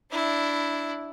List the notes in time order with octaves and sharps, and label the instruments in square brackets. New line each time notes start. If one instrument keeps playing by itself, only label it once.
[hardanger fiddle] D4 E4